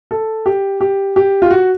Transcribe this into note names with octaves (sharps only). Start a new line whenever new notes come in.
A4
G4
G4
G4
F4
F#4